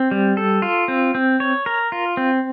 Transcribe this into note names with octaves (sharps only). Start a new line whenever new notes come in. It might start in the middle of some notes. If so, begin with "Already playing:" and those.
Already playing: C4
G3
A4
F4
C4
C4
C#5
A#4
F4
C4